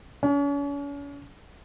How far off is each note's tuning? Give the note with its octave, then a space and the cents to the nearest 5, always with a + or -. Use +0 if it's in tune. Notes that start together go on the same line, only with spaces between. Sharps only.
C#4 +40